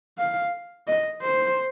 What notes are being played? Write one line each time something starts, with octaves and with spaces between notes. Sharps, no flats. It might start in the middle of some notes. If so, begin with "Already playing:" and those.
F5
D#5
C5